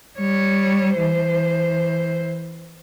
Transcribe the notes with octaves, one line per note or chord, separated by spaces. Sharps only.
G3 C#5
E3 C5